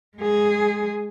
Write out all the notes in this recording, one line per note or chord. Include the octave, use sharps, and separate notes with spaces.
G#3 G#4